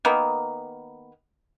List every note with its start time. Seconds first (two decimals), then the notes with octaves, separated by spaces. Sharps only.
0.05 D#3 A#3 B3